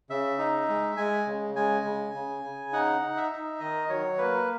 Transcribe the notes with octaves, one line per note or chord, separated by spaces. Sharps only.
C#3 E5
D#4
G#3
G#3 G#5
C#3
G#3 G#5
C#3
C#3
C#3
D#4 F#5
D#4
E5
D#4
D#3 D#5
F#3 C#5
A#3 B4